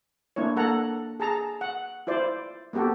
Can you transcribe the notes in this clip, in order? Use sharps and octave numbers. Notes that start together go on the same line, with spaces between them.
A#3 D4 E4 C#5
A#3 A4 F#5 A#5
G#4 A5 A#5
F#5
E4 F4 C5 D5
A#3 B3 F#4 G4 A4